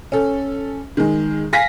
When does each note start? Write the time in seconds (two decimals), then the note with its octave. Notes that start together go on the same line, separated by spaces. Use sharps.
0.12 C#4 A4
0.97 D#3 G#3
1.53 F5 G#5 A#6 B6